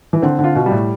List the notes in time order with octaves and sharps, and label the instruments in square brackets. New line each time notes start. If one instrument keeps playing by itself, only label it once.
[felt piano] E3
[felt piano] D3 [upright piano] C4
[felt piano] D3
[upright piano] F4
[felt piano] B2
[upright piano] G3
[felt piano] A2